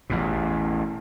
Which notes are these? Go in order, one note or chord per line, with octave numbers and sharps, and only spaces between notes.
A1 E2 B2